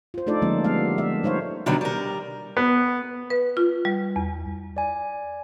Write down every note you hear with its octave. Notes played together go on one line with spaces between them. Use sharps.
F4 C5
A3 D4 D#4 F4 A4 D5
D3 F3 G#3 A#3 C#4 D4
G3 A#3 B3 F5
E5
G3 D#4 C5 C#5 F5
B2 D3 D#3 F#3 G3 B3
G3 A#4
B3
B4
F4
G3
E2
D5 G#5